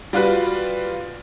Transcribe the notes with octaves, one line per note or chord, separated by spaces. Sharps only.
G3 F4 F#4 B4